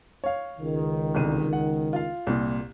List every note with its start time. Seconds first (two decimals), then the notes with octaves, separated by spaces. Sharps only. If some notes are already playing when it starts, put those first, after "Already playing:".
0.24 C#5 F5
0.59 C#2 D#3
1.15 G1 C2 D#7
1.53 F#5
1.93 F4 F5
2.27 C2 A#2